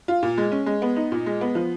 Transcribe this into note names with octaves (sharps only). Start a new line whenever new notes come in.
F4
A#2
G#3
C#4
G#3
B3
D#4
A#2
G#3
B3
F3